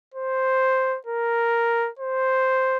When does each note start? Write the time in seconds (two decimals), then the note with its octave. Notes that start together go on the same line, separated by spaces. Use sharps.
0.14 C5
1.06 A#4
1.99 C5